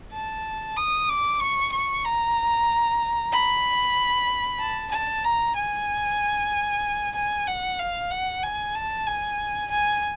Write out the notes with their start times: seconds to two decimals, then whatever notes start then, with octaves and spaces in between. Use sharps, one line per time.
0.13 A5
0.76 D#6
1.09 D6
1.40 C#6
1.72 C#6
2.04 A#5
3.32 B5
4.59 A5
4.92 A5
5.24 A#5
5.55 G#5
7.15 G#5
7.47 F#5
7.79 F5
8.11 F#5
8.43 G#5
8.75 A5
9.06 G#5
9.70 G#5